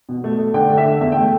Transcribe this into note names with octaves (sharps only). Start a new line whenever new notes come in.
B2
A3
A3
D3 G5
A3
E5
D3
E2 E5
A3 G5